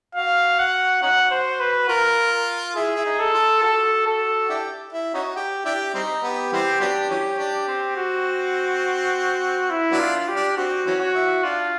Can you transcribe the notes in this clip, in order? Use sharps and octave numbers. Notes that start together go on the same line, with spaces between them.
F#4 F5
F#5
C#4 D#4 F#4 F#5
C5
B4
F4 A#4
E4 G#4
E4
D#4
A4
F4
F#4 A4
A4
D4 E4 G4
E4
C#4 D#4 F#4
G4
D4 E4 G4
G3 C4 D#4
B3 G4
E3 G3 C4
F#3 B3 D4
E3 F#3 C#4
D4
C4
F#4
E4
F#3 B3 D4
F4
G4
D4
C4 F#4
E3 F#3 C#4
F#4
E4
D4 F4